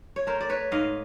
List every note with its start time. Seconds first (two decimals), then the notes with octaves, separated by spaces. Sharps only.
0.16 C#5
0.27 A3 A#4 C5
0.41 D5
0.49 B4 C#5
0.72 G#2 D#5 F5